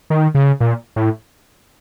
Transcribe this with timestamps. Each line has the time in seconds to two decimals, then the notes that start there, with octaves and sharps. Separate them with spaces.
0.10 D#3
0.35 C#3
0.60 A#2
0.96 A2